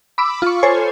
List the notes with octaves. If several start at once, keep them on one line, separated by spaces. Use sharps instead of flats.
B5 D6 E6
F4 C#6
A4 C5 C#5 G#5